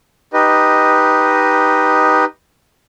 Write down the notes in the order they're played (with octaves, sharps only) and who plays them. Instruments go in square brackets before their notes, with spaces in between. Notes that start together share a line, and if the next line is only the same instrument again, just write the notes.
[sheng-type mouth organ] D#4 G4 B4 D#5